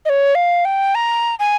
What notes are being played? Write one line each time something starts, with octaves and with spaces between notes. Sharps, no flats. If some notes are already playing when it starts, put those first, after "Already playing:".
D#5
C#5
F5
G5
A#5
G#5